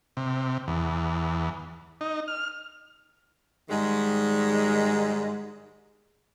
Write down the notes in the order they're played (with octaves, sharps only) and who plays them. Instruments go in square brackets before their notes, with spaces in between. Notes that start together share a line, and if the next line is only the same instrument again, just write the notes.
[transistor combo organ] C3
E2
D#4
F6
[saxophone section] G#2 D#3 G3 G#3